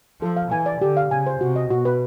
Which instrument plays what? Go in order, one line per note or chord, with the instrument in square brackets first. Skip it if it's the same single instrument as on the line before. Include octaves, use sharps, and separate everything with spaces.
[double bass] F3 [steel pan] A4
[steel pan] F5
[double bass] E3 [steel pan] G#5
[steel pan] D5
[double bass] D3 [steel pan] G4
[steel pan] F5
[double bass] C#3 [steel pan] G#5
[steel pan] C5
[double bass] C3 [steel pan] F#4
[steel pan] D#5
[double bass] B2 [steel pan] F#4
[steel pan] B4